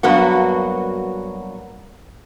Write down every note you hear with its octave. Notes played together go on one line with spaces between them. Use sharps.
G2 F#3 A#3 B3 F#4